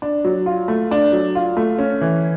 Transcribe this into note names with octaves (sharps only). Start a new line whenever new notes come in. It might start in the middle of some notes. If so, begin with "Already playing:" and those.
D4
F#3
F4
A3
D4
F#3
F4
A3
C#4
E3